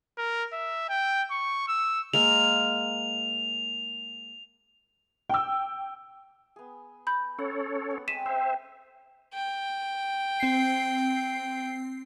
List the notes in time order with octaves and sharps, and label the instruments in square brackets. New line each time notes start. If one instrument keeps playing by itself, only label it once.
[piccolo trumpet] A#4
E5
G5
C#6
E6
[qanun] G#3 A#3 A#4 [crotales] F7
[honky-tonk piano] G5 E6
[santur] B3 G#4
[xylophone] B5 G6
[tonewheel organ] C#4 A4 C#5 [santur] F#5
[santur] B3
[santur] G#3 C4 [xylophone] B6 D#7 E7
[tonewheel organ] C5 E5 [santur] G5 G#5
[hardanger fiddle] G5
[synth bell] C4 C7